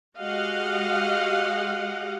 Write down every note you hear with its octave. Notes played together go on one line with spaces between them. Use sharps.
G#3 F#4 G4 D#5 F5 F#5